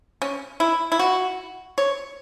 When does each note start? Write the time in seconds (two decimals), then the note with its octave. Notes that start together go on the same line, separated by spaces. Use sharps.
0.22 C#4
0.60 E4
0.92 E4
0.99 F#4
1.78 C#5